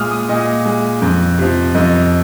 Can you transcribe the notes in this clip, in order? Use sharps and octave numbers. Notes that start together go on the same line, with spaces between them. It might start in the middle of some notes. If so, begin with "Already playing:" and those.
Already playing: A#2 G#3 D#6 F6
D#6
A#2 D#5
G#3
F2
C3 F3
F2 D#5